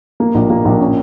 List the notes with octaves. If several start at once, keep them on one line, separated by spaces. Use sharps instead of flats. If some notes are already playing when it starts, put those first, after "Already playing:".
A#3
A#1
A#3
A#1
C#4